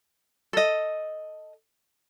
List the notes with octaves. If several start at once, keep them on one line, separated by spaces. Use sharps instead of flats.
A4 D#5